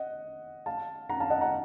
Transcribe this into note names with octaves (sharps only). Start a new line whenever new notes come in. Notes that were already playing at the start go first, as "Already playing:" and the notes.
Already playing: D#5 F#5
F5 A5
F#5 A#5
F5 A5
D#5 F#5
F#5 A#5